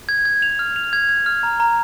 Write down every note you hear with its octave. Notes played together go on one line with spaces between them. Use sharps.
G#6
G#6
F7
F6
F7
G#6
G#6
F6
A#5
A#5